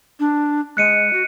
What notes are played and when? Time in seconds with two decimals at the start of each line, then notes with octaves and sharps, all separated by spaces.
0.20 D4
0.77 G#3 F#6 C#7 D#7
1.13 F#4